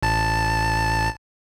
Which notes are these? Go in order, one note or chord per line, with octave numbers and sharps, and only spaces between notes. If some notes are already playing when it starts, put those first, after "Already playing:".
A1 A5